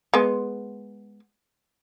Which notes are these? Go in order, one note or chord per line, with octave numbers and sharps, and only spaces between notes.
G#3 B3